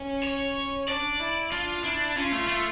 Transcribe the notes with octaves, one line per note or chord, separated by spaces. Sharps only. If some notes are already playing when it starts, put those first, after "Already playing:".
Already playing: C#4
C#5
D4 D5
E4
D4 F4
D4 E4
C#4 F4
A3
A3